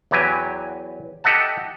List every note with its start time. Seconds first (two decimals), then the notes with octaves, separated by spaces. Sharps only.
0.11 E2 E3 F#3 G4 G#5
1.24 G4 A4 D#5 E5 F#5 A5